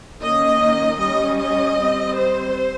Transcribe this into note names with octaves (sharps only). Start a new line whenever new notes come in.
D#3 A#3 C#4 D#5
G3 C#4 D#5
D#5
G3
C4
C5